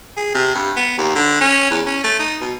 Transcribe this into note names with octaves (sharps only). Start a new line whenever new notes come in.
G#4
C3
G2
B3
D#2
D3
C#4
E2
C#4
A3
D#4
B2